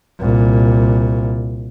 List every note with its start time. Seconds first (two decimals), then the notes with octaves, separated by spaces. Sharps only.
0.20 C2 A#2